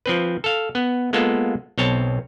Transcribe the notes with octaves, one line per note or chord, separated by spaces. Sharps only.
F3 C4 B4
A4 F5
B3
G#3 A#3 B3 F4 A4
B1 C4 C#5 A5